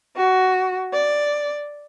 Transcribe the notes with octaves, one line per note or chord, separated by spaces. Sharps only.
F#4
D5